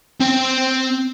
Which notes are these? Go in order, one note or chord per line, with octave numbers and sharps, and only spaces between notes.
C4 G5